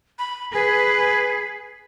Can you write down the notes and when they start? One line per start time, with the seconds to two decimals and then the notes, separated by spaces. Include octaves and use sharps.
0.19 B5
0.53 G#4 B4